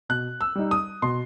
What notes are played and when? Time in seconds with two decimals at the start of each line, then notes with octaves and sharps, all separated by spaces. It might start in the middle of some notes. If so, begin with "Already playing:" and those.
0.09 B2 F#6
0.41 E6
0.55 G3 D#4
0.71 D#6
1.02 B2 C6